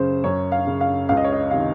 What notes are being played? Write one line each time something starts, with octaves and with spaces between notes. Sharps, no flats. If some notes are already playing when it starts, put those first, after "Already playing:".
Already playing: F#2 C#3 C5
F#2 C#5
F5
C#3
F5
C#2 F5
D#5
C#5
D#5
C3 D#3 F5